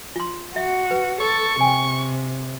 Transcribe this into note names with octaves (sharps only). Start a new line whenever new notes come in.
F4 C6
F#4 E5
B4
A4 C#6
C3 G5 G#5